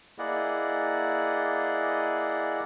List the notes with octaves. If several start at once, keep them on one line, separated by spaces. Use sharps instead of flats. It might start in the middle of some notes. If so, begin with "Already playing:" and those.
A#3 E4 G#4 D5 D#5 F#5